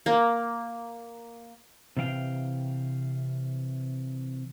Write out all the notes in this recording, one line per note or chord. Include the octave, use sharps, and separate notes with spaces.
A#3
C3 E3 F5 G5